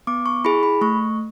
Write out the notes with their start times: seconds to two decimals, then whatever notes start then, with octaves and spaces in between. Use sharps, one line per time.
0.07 B3 D6
0.26 C#6
0.45 E4 G#4 B5
0.63 B5
0.81 A3 C#6